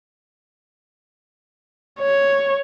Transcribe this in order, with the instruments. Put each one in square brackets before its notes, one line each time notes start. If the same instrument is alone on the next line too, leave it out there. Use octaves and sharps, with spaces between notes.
[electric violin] C#5